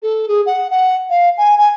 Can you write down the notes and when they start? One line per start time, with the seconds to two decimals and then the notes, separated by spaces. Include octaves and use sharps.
0.03 A4
0.28 G#4
0.46 F#5
0.71 F#5
1.10 F5
1.38 G#5
1.58 G#5